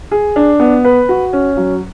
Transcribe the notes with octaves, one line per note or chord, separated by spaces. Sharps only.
G#4
D4
B3
B4
F#4
C#4
F#3